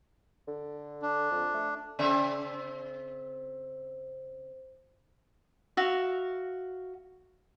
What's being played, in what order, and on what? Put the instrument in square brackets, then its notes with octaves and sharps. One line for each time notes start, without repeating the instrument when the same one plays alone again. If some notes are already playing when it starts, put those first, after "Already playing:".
[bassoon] D3
[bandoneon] D4
[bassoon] F2
A3
[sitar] C#3 C4 E5
[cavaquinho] F#4 E5 F5